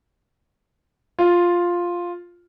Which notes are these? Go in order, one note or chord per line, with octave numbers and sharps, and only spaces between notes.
F4